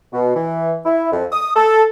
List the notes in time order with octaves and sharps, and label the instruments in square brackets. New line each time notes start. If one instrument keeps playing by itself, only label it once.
[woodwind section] B2
E3
E4
F2
D#6
A4